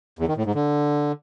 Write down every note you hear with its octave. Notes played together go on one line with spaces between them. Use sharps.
E2
D#3
A2
G#2
D3